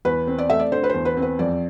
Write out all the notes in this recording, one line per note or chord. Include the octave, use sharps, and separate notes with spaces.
E2 B4
C4
D5
A3 E5
D5
D3 C5
B4
E2 C5
B4
C4
B4
F2 D5